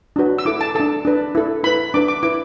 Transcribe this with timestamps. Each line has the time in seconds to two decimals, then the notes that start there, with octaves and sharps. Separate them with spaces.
0.16 D4 F#4 B4
0.38 E6
0.45 E4 A4 D6
0.61 A5
0.75 D4 A4 A5
1.05 D4 B4
1.35 E4 A4
1.63 E4 B4 B5
1.94 D4 B4 D6
2.08 D6
2.23 E4 B4 D6